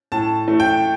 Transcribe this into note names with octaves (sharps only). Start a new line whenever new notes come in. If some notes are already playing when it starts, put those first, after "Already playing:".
A2 A5
E3 A3
G5